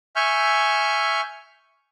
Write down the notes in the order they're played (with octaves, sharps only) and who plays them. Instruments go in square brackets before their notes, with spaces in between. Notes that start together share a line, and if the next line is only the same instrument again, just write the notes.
[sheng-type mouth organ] E5 G#5 C#6 F6 G6